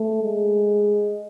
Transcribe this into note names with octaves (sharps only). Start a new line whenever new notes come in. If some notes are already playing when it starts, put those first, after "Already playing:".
Already playing: A3
G#3